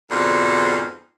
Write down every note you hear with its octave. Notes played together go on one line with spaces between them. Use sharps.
F2 G#2 B2 D3